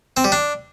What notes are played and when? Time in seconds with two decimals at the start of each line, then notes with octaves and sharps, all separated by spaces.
0.17 C4
0.24 G3
0.32 D4